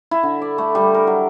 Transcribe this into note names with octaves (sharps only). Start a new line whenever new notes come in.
E4
D3
D5
A3
G3
A#4
F#3